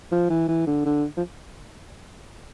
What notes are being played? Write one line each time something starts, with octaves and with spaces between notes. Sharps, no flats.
F3
E3
E3
D3
D3
F3